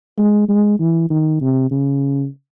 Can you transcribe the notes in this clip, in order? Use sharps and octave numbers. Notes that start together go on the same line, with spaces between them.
G#3
G#3
E3
D#3
C3
C#3